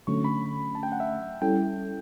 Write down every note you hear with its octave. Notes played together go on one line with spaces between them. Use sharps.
D3 F#3 A3 C#4 C#6
B5
A5
G5
F#5
E5
G3 C#4 E4 A4 G5